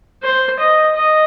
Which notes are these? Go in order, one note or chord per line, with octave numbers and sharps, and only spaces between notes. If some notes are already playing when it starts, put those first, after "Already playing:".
C5
D#5
D#5